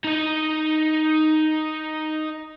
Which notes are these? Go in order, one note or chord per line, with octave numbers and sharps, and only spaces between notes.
D#4 D#5